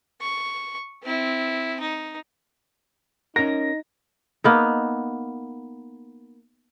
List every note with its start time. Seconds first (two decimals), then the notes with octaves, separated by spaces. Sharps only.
0.21 C#6
1.03 C4 E4
1.80 D#4
3.36 C#4 D#4 A#4 A#6
4.44 A#3 B3 D#4